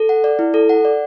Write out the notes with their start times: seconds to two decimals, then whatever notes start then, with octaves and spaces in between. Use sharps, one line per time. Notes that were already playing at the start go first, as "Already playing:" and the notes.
Already playing: A4
0.09 F#5
0.24 D5
0.39 E4
0.54 A4
0.69 F#5
0.85 D5